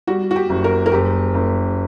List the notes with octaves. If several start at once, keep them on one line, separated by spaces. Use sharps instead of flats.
G3 F#4
F#4
G4
F#1
A#4
A#4
F#1 G4
F#1